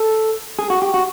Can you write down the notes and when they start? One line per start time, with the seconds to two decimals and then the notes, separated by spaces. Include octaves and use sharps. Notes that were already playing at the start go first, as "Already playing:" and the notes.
Already playing: A4
0.59 G#4
0.70 F#4
0.82 G4
0.94 F#4